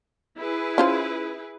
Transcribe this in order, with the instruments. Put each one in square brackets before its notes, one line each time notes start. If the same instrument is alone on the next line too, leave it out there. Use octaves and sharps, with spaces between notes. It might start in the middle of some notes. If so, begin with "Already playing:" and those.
[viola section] E4 G#4 B4
[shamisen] C#4 F4 C5